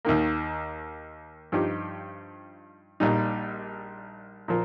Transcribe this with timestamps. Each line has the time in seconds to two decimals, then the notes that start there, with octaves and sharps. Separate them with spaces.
0.05 D#2 D#3 A#3
1.52 G2 F3 D#4 G4
3.00 A#1 A#2 G3 D#4
4.48 A#2 F3 A#3